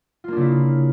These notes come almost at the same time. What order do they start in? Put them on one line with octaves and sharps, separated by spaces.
F4 A#3 D4 C#3 E4